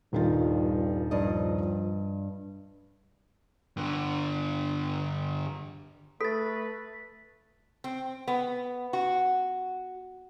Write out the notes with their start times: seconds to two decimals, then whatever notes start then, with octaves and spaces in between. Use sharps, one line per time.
0.13 D#1 G2 D#3 F4
1.11 G2 F3 D#5
3.77 G2 D3
6.21 A3 A4 B4 A6 B6
7.84 C4
8.28 B3
8.93 F#4